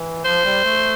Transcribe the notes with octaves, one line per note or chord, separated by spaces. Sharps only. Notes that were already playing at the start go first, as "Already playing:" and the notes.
Already playing: E3
F3 C5
G3
A3